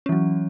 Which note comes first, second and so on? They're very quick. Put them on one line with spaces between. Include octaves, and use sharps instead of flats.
C#4 E3 F#3